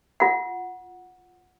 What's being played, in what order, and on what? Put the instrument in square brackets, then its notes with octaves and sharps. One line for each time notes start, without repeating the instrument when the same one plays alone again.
[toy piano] F4 F#5